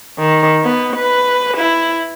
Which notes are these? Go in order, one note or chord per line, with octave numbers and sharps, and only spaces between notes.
D#3
B3
B4
E4